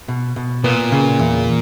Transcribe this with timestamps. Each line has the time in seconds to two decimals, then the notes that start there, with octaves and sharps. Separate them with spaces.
0.08 B2
0.36 B2
0.64 A#2 B3
0.92 C#3
1.19 E2